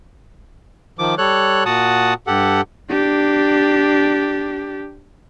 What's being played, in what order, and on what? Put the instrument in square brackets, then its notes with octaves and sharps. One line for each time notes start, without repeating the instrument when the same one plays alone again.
[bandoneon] D#3 F3 D6
G3 A4 C#5 F#6
A#2 F#4 F#5 A5 D#6
G2 G4 A4 F#5
[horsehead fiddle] D4 G4